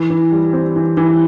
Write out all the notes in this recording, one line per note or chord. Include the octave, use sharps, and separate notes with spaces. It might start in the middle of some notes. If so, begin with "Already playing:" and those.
Already playing: E3
E3
G3
C4
E3
E3